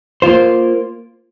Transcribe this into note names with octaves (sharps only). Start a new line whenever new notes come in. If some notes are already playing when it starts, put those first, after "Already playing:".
A#3 F4 C5